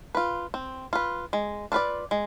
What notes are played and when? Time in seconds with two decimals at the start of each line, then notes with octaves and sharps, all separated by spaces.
0.15 F4 B4
0.54 C4
0.93 F4 B4
1.33 G#3
1.72 D4 F4 B4 D5
2.11 G#3